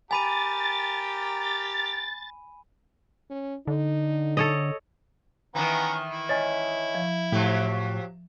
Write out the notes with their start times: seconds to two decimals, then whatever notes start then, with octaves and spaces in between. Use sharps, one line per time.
0.11 G4 A#4 G5 G#5 B5 A6 D#7
3.30 C#4
3.67 D3 D#4
4.37 A4 C#5 D#5
5.55 D#3 E3 B3 C#4 A#5
6.09 E4
6.29 C#5 D#5 G#5 A6
6.95 F3
7.32 A2 F3 F#3 G4 E5